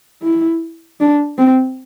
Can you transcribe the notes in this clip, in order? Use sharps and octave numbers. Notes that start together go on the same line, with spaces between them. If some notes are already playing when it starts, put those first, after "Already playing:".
E4
D4
C4